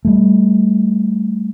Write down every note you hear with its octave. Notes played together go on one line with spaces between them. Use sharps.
G3 A3